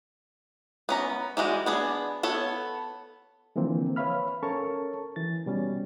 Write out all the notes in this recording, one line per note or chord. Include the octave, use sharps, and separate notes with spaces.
B3 C#4 A#5
E3 G3 G#3 F#4
B3 D4 G#4
B3 A4 C#5
D3 E3 F3 A#3 C4
B4 C#5 E5 F5 B5 F6
C#4 A4 A#4 C#5 A5 C#6
E3 A6
B2 G3 C#4